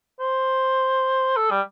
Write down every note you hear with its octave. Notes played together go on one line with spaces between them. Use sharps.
C5
A4
G3